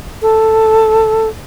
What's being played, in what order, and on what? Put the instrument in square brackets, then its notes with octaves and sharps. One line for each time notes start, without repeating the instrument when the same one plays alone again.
[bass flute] A4